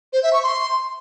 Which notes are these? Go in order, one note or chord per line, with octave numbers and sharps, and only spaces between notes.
C5
E5
C#6
C6